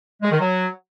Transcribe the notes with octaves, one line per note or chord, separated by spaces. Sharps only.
G#3
D#3
F#3